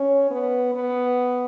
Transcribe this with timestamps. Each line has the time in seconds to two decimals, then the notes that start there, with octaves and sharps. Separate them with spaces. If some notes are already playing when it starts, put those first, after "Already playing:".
Already playing: C#4
0.31 B3
0.75 B3